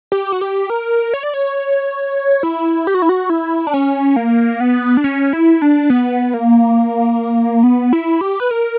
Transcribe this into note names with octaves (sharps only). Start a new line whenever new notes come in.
G4
F#4
G4
A#4
C#5
D5
C#5
E4
G4
F#4
E4
F#4
E4
D4
C#4
A#3
B3
D4
C#4
E4
D4
B3
A#3
B3
E4
G4
B4
A#4